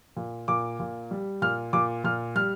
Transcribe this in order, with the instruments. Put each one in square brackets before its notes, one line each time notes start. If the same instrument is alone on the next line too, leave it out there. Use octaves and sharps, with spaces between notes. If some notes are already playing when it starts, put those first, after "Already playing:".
[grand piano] A#2
A#2 D6
A#2
G3
A#2 F6
A#2 D6
A#2 F6
G3 F6